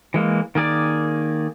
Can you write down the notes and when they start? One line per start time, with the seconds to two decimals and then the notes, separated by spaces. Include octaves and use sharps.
0.14 E3 G#3 A#3
0.55 D#3 A#3 G#4 D5